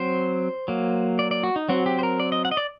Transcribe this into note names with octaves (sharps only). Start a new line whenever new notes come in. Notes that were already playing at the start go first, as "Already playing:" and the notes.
Already playing: F#3 C4 C5
F#3 A#3
D5
D5
F#4
D#4
F#3 C4 F#4
G4
C5
A#4
D5
D#5
F#5
D#5
D5